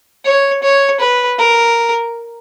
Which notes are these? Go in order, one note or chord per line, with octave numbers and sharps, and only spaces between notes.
C#5
C#5
B4
A#4